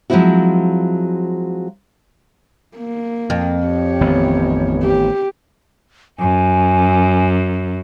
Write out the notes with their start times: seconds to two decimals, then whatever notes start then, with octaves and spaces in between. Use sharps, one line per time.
0.10 F3 F#3 G#3 C4 E4 F#4
2.77 A#3
3.30 F2
3.67 G4 C#5
4.01 A1 D#3 B3
4.83 G4
6.19 F#2 G#5